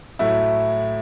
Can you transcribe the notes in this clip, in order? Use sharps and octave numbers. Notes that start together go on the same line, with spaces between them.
A2 F#3 A3 E4